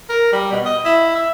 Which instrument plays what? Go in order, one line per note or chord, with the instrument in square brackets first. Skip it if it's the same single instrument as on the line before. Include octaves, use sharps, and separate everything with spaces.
[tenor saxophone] A#4
G3
B2
D#5
E4
E5